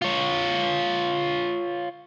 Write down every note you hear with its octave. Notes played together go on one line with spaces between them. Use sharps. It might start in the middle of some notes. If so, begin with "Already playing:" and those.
F4 C#5